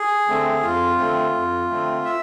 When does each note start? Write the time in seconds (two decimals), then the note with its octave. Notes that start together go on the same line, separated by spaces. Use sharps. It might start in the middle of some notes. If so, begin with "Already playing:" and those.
Already playing: G#4
0.27 D3 A3 C4
0.62 F2 F4
0.98 D3 A3 C4
1.33 F2
1.69 D3 A3 C4
2.05 E5